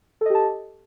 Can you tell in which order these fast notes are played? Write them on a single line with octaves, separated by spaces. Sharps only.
A4 D#5 G4 A5